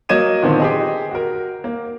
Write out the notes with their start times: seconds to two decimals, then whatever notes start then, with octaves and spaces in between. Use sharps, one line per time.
0.09 F#3 A#3 D#5 G#6 D#7 E7
0.42 A#2 D3 D#3 B3 C4
0.60 G4 G#4 D#5
1.11 F#4 A#4
1.64 A#3